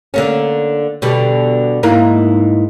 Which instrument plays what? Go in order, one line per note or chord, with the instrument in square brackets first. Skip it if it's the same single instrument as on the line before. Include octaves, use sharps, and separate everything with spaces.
[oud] D3 A#3 C#4
B2 D3 G3
G#2 E3 A#3